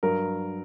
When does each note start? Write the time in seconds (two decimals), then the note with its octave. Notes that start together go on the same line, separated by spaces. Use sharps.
0.03 G2 F#3 A#4